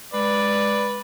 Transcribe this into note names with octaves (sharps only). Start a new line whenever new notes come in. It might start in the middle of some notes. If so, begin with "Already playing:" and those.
G#3 B4 D5